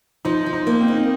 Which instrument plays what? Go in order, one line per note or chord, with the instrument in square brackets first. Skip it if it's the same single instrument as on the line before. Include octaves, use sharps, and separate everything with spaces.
[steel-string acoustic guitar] F3 [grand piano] D#4
[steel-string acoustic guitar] F3
[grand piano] D#4
[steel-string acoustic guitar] A#3
[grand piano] C4
[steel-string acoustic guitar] D#4